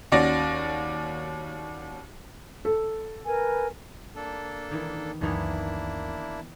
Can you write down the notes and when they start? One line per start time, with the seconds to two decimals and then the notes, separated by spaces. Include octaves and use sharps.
0.12 D#2 C#4 F#4 D5 A#6
2.65 A4
3.26 A#4 B4 G#5
4.16 A#3 D4 A4
4.71 D#3 E3
5.21 C#2 F#2 D#3 E3 A#3 B3 D4 E4